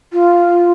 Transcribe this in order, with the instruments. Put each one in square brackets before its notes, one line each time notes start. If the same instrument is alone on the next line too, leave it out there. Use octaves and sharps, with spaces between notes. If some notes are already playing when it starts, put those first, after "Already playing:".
[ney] F4